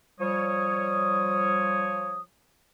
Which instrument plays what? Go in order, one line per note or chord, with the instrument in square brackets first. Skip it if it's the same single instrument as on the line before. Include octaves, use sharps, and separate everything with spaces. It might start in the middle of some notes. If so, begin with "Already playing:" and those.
[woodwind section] F3 G3 C#5 D#6